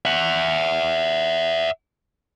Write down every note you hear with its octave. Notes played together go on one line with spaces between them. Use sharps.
E5 F#5